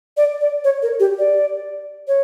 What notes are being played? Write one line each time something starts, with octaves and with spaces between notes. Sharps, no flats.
D5
D5
C#5
A#4
G4
D5
C#5